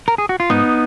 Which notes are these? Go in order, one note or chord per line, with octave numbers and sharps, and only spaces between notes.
A#4
G#4
F#4
F4
G#2 B3 D#4